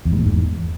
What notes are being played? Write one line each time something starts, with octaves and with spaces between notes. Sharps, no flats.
E2
G#2
A#2
G#2
E2